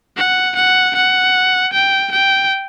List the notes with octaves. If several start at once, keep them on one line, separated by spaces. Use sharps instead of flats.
F#5
F#5
F#5
G5
G5